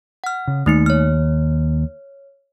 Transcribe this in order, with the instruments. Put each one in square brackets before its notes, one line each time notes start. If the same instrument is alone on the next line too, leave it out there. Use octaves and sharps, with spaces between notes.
[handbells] F#5 F6
[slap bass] C#3
[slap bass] D#2 [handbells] A3 D#4 C#7
[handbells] C#5 F6